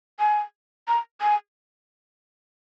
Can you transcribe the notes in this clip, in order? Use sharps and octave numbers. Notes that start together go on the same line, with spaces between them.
G#5
A#5
G#5